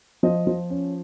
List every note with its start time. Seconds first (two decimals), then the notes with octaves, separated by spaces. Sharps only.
0.23 F3 D#5
0.47 F3
0.70 C#4